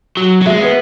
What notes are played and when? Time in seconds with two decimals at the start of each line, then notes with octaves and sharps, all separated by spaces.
0.17 F#3
0.42 F#3
0.46 G#3 E5
0.61 B3 B4